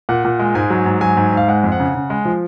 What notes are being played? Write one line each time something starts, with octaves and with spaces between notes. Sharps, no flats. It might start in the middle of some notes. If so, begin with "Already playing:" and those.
A#2 F#5
A#2
G#3
G#2 G#5
F#3
G#2
F#3 G#5
G#2
G#2 F5
G#3 F#5
F2
F#5
C#3
C#3
G#3
F3